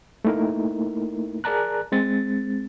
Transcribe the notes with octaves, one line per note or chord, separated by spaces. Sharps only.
A3 A#3 D#4 E4 A#4
G#4 A#4 D5 A5 A#5 F#6
G#3 C4 A6